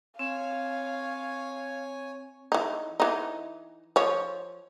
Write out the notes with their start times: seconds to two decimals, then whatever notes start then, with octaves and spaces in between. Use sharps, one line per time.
0.19 C4 C#5 F5 G#5
2.52 E3 D#4
3.00 E3 D#4
3.96 F3 C#5